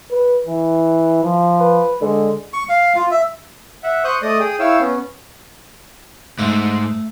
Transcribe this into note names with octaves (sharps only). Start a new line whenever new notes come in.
B4
E3
F3
B4
D3 G#3
C#6
F5
F4
E5
E5 F#5
C5 C#6 D#6 F#6 G6
A3 D5 D#5 D#6
G#4 G5 D#6
E4 C#5 F5 G5 E6
B3 C#4
G#2 A3